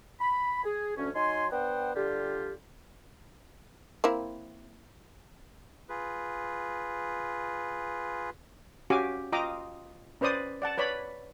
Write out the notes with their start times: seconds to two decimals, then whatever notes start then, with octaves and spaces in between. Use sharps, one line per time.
0.21 B5
0.64 G#4
0.97 D2 C#4
1.15 F#3 D#4 G#5 C6
1.51 B3 D4 C5 F#5 G5
1.96 D3 G3 F4 G4
4.04 A#3 C4 E4
5.89 F4 G#4 B4
8.90 C#4 F#4 G4 F5 G#5 D6
9.32 F4 D#5 G5 A#5 D6 D#6
10.21 C#4 B4 C5 D5 D#6
10.62 D5 F#5 A5
10.78 B4 C#5 D5 B5